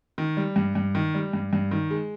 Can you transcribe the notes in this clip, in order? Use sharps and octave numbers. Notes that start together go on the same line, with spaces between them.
D#3
G3
G2
G2
D#3
G3
G2
G2
D#3
G#3